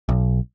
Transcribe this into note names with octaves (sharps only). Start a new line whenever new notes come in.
B1